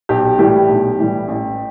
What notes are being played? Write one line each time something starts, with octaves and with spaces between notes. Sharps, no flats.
B1 G4
A2 E3 G3 G4
B1
A2 E3 G3
A1